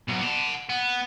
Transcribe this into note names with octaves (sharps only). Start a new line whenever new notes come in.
B2 F#3
F#5 A5
B3